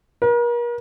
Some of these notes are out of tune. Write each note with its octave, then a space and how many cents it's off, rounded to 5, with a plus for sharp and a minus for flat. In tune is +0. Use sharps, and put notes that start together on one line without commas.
A#4 +40